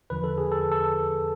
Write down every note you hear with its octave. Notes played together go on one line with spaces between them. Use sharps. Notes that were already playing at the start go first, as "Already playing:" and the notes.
E2 D3 F3 B4
A4
G#4
A4
A4